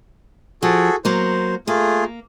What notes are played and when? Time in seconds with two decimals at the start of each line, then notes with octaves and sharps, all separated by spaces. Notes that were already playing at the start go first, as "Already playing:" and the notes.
0.62 F3 F#4 G#4 A4
1.05 F#3 A#3 C5
1.67 A3 A#3 F4 G#4